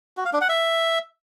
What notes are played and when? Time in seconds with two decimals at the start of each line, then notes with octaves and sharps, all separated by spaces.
0.17 F#4
0.25 F5
0.33 D4
0.41 F#5
0.49 E5